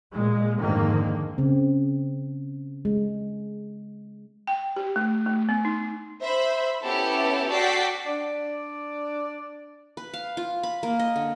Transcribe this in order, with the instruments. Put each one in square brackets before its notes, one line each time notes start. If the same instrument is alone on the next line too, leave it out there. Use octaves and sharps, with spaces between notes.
[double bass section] A#2 G#3
F2 G#2 D3 D#3 A#3
[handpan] C#3 C4
G#3
[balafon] G5
G4
A3
A3
B3
D#4
[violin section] C5 E5 B5
B3 C#4 E4 G4 A4
F#4 A4 D5 G5 B6 C7
[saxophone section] D4 D5
[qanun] B4
F5
F4
B5
A#3
D#5
D3